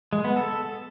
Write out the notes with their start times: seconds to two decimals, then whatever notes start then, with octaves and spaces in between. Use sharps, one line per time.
0.13 G#3
0.24 B3
0.36 A4